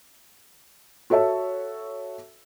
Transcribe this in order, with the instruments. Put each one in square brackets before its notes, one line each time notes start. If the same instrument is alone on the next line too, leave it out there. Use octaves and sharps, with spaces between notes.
[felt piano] F#4 A4 C#5 E5 A5